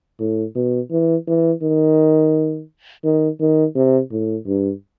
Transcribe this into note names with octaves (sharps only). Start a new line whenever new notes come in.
A2
B2
E3
E3
D#3
D#3
D#3
C3
A2
G2